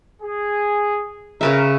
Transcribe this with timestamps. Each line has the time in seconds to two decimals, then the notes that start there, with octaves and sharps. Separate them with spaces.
0.22 G#4
1.41 C#3 C#4 A#4 B4 E5